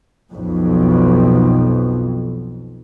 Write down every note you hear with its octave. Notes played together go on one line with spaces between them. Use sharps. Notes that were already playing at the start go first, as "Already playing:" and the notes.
B1 F2